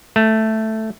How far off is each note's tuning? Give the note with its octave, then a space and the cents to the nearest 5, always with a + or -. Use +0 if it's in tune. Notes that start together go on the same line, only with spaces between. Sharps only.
A3 +0